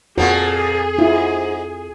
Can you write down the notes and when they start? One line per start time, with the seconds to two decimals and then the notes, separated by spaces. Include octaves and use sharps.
0.18 F2 A#2 F3 A#3 F#4 G#4 C#6
0.98 G#2 E4 F4